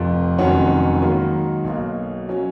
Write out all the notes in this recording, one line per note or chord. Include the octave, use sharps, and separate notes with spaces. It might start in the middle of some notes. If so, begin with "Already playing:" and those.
Already playing: F1 F2 F3
F1 F2 D#3 F#3 C#4 F#5
G#2 D#3 F#3 A#3
B1 B2 A#3
F#3 C#4